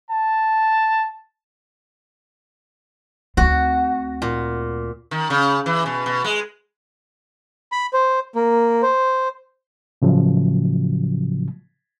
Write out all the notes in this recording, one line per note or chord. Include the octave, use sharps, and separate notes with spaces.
A5
D2 C4 F#4
A#2
D#3
C#3
E3
B2
B2
G#3
B5
C5
A#3
C5
A2 C#3 F3 F#3